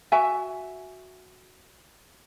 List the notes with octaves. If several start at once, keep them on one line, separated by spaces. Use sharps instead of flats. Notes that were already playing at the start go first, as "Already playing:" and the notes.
F#4 E5 G#5